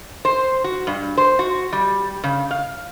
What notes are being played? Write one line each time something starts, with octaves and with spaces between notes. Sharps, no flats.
C5
F#4
G2
C5
F#4
G3
C#3
F5